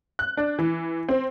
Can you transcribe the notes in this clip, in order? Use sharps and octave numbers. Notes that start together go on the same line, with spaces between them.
F#6
D4
E3
C4